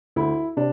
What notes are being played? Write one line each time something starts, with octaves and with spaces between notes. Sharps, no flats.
D2 E4
C3 D4